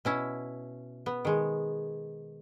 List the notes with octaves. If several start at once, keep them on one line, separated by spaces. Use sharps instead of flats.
B2 C#4 E4
B3
D#3 G#3